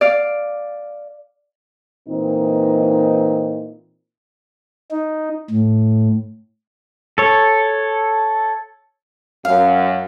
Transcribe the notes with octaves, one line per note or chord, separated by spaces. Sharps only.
D5 F5
A#2 E3 C4 D#4
D#4
A2
A4 C#5
F#2 F5